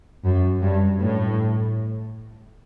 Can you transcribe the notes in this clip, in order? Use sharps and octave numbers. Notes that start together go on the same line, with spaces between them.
F#2
G2
A2